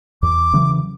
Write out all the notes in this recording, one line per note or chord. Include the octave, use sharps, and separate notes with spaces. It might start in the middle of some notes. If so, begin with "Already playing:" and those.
E2 D6
C#3 E3 F#3